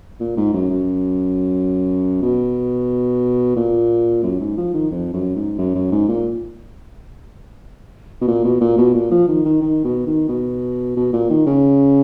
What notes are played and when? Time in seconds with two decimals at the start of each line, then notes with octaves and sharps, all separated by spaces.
0.20 A#2
0.37 G#2
0.54 F#2
0.70 F#2
2.22 B2
3.56 A#2
4.23 F#2
4.40 G#2
4.57 F3
4.74 D#3
4.91 F2
5.14 F#2
5.36 G#2
5.58 F#2
5.75 F#2
5.92 G#2
6.08 A#2
8.21 B2
8.28 A#2
8.44 B2
8.61 A#2
8.78 B2
8.94 A#2
9.11 F3
9.28 D#3
9.45 D#3
9.62 D#3
9.84 B2
10.07 D#3
10.29 B2
10.96 B2
11.13 A#2
11.30 D#3
11.46 C#3